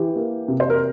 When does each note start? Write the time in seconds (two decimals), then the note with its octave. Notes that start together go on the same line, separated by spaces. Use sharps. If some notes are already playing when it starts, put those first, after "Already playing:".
Already playing: E3 G4
0.16 A#3
0.48 C3
0.60 C5
0.70 A#4